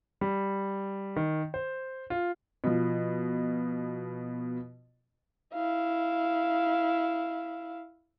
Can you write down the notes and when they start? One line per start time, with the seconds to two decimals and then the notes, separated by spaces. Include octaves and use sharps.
0.21 G3
1.16 D#3
1.54 C5
2.10 F4
2.64 B2 F3
5.54 E4 F5